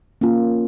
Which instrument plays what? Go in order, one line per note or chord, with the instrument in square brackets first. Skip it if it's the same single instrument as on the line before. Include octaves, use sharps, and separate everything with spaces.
[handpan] A#3 C#4 F4